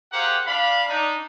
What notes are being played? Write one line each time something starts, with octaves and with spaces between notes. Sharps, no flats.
G4 G#4 A#4 C5 F5 F#5
D4 F5 B5
D4 D#4